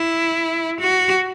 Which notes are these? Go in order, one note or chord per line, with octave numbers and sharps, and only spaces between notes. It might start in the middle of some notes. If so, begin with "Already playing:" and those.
Already playing: E4
F#4